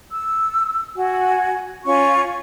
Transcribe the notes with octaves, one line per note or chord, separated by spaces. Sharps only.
E6
F#4 G#5
C#4 F4 C#6